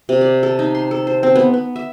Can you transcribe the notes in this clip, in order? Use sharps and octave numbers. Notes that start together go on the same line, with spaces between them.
C3
D5
A4
D#4
C6
A4
C5
C4
B3
B3
E5